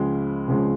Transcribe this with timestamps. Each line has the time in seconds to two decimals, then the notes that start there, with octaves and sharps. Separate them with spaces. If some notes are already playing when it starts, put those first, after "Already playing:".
Already playing: C#2 C#3 F3 G#3
0.48 C#2 C#3 F3 G#3